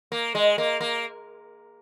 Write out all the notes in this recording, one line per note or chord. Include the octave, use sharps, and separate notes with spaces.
A#3
G#3
A#3
A#3